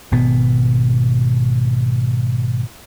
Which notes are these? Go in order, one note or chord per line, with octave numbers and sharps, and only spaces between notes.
G#1 B2 B3